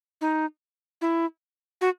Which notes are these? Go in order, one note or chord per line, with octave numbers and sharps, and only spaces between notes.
D#4
E4
F#4